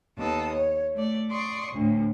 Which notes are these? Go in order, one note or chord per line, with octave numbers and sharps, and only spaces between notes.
D#2 B3 A4 D#6
C#5
A3 D5
D5 C6 C#6 D#6
D2 A2